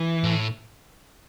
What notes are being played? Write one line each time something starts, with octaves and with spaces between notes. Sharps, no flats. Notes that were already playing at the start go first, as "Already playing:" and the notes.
Already playing: E3
A2